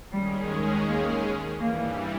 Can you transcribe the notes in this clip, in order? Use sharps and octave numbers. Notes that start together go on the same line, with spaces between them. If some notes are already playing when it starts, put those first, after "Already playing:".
D#2 D#3 G3 G#3 C#4 G#4
A#3
G2 E3 G3 A#3